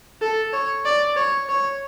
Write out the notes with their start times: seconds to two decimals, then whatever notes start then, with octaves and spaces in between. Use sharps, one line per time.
0.22 A4
0.53 C#5
0.85 D5
1.16 C#5
1.49 C#5